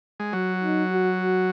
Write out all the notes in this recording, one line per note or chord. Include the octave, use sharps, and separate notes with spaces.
G#3
F#3 F#4
D#4
F#4
F#4